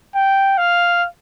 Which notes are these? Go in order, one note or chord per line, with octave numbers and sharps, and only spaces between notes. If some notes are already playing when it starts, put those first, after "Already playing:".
G5
F5